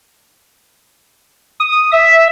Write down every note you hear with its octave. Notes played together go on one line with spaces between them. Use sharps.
D#6
E5